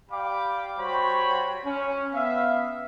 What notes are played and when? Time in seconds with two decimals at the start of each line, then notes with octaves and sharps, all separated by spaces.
0.11 G4 D5 F5 G5 B5 D6
0.78 G3 F#4 C5 C#5 G5 B5
1.65 C#4
2.13 B3 E5 F5